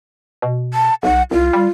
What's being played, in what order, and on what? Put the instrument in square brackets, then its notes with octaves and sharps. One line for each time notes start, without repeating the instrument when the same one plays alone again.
[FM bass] B2
[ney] A5
[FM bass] B1 [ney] F#5
[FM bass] C2 [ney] F4
[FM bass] G3